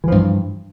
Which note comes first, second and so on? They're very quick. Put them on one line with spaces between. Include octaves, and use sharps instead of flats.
E3 F3 G2